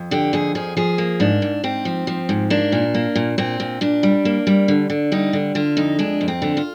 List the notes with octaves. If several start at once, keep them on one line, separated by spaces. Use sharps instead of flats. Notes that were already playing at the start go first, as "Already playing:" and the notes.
Already playing: F2
D3 G4
F2 G#4
F3 G#4
F3 G#4
A#3
G#2 D4
G#2
G#2 C4
F3
F3
G#2
A#3 D4
A#2
A#3
A#2
A#2 C4
A#2
A#2 D4
G3
A#3
G3
D3
D3
G3 D#4
D3
D3 F4
F2 D#4
G#3 D4
F2
C4
D3
F4